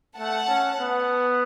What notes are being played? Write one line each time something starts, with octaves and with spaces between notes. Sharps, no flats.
A3 F#5 A5
C#4
B3